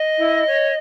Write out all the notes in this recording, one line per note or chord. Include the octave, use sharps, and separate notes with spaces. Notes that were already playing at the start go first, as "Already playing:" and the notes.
Already playing: D#5
E4
C#5